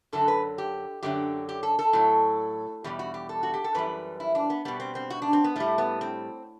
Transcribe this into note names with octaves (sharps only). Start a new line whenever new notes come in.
F#2 D3 F#3 A4
B4
G4
F#2 D3 F#3 G4
G4
A4
A4
A2 F#3
E2 B2 G3 G4
F#4
G4
A4
F#4
G4
A4
F#2 E3 G3 B4
E4
D4
B3
B2 G3 B3
C4
C4
F#4
D4
C4
B3
A2 G3 A3
B3
C4